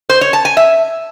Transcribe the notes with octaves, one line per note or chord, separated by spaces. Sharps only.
C5
C#5
A5
G#5
E5